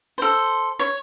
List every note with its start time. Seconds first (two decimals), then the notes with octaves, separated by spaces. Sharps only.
0.18 A4 C5
0.79 C#5